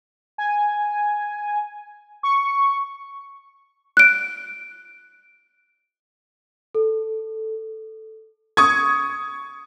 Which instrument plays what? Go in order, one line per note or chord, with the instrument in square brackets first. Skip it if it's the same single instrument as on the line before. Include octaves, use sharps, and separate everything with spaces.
[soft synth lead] G#5
C#6
[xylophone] F#6 D7
[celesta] A4
[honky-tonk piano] C#6 D#6 G#6